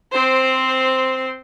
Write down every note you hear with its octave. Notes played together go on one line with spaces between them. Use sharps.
C4 C5